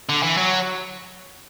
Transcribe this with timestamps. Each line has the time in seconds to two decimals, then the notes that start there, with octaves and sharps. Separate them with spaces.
0.09 D3
0.23 E3
0.37 F#3